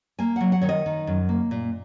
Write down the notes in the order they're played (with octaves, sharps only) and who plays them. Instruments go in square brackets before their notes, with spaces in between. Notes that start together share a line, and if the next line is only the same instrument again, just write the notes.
[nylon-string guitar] A#3 G#5
F#3 F#5
F#5
D#3 C#5
D#5
D#3
F#2
A#3
A#2